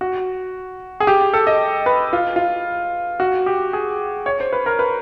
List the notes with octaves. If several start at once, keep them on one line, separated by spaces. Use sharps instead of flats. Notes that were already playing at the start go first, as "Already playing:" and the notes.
F#4
G#4
G4
A4
D#5
B4
F4
F4
F#4
G4
G#4
C#5
C5
B4
A#4
B4